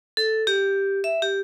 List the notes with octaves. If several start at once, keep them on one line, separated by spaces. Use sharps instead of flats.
A4
G4
E5
G4